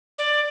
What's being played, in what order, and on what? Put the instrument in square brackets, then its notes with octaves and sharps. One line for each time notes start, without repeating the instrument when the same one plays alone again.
[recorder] D5